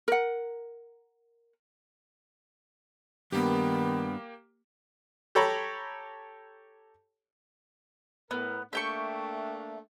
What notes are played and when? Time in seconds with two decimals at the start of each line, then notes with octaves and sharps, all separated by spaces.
0.08 A#4 F#5
3.32 G2 D#3 A#3 B3 G4
5.35 G4 A4 C#5 A#5 B5
8.31 A2 B3 A#4
8.73 A3 A#3 D4 E5 G5 C#6